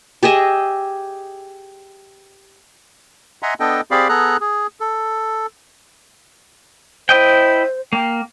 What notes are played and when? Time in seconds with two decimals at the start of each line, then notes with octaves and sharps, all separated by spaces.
0.23 G4 G#4 D#5 E5
3.43 D#5 E5 F#5 G#5 A#5 C6
3.60 B3 D4 A4 D#5 G5
3.91 C4 G4 G#4 D5 F5 B5
4.09 B3 G#4 A4 A#5 F#6
4.41 G#4
4.80 A4
7.09 E4 C5 D#5 G5
7.93 A#3 G5